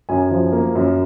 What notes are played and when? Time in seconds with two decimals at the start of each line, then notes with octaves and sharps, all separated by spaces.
0.09 F#2 G#5
0.31 F3
0.52 A#3
0.75 F#2